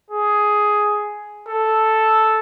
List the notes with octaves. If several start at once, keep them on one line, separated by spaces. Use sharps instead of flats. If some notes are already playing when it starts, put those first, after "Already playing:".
G#4
A4